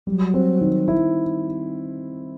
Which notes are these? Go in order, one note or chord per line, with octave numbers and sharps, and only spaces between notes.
F#3 G3
C4
D#3
E4